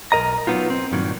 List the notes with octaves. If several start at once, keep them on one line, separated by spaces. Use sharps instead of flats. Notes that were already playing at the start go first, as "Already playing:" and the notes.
B1 B2 A#4 D#5 A#5
F#3 G#3 B3 D#4 F4
C4
G2 A#2 D#3 F#3